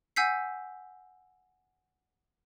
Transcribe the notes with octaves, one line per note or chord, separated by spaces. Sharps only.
F#5 G#5 E6 G6 B6 C7